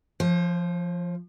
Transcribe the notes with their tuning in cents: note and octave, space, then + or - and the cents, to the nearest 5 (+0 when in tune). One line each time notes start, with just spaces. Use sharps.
F3 -15 C5 +40